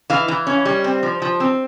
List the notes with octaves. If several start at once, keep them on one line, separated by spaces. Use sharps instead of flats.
E3 F5
E3
C#4
G3
C4
F3
F3
C4